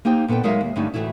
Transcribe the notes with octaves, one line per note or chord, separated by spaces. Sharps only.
A#3 D#4 G4 C5 G5
A#2 B3 A4 B4 G5
F#3 G#3 D#4 A#4 E5 F5
D#2
G2 D3 G3 A3 C#4 D#4
D2 A2 D3 E3 A3 E4